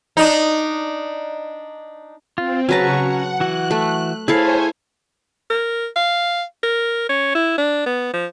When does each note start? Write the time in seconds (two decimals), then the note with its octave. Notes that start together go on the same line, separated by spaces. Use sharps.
0.17 D4 D#4
2.38 C4 F4
2.69 C#3 F#3 C#4 F#4 B4 A5 A#5 C#6
3.03 F#5
3.40 E3 F#4 F#6
3.71 A3
4.28 E4 G#4 A4 C5 C#5 F5 G#5
5.50 A#4
5.96 F5
6.63 A#4
7.09 C#4
7.35 E4
7.58 D4
7.86 B3
8.14 F3